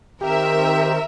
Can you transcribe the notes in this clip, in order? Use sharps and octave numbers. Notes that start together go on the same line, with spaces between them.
D#3 C4 G4 A#4 E5